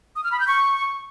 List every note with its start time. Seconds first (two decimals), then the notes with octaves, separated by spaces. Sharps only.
0.16 D#6
0.24 F6
0.32 B5
0.40 G6
0.48 C#6